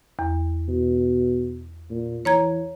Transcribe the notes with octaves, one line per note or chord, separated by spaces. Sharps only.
E2
B2
A#2
E3 C#5 A#5 G#6